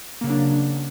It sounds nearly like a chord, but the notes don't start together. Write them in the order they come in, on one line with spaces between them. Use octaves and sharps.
A#3 C#3 F#3 D4